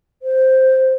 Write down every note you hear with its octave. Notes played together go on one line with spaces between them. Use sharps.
C5